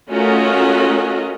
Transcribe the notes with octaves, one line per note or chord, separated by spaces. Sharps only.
A3 C#4 F4 F#4 A#4 D#5